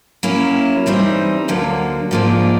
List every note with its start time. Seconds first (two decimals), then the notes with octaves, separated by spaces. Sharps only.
0.23 F#3 A#3 C#4 E4
0.86 E3 G3 C4 D#4
1.48 D2 D3 F#3 A#3
2.11 G#2 F3 A#3 D4